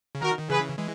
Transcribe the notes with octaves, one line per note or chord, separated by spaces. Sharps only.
C#3
D#3 F#4 A#4
D#3
C#3 E3 G#4 B4
E3 G#3